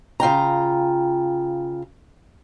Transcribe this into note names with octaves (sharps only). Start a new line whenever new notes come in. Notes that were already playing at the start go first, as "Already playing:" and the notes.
C#3 F4 G5 A#5